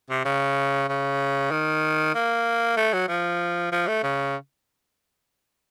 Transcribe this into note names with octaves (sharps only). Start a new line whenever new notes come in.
C3
C#3
C#3
D#3
A#3
A3
F#3
F3
F3
A3
C#3